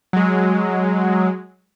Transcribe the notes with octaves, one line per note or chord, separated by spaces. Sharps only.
F#3 G#3